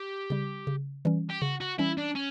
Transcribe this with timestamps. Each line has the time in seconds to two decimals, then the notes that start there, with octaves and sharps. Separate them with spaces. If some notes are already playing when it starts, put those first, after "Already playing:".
Already playing: G4
0.30 C#3 G3
0.67 C#3
1.05 E3 G3 C#4
1.30 G4
1.42 C#3 F#4
1.61 F#4
1.79 E3 G3 C#4 E4
1.98 D4
2.15 C#4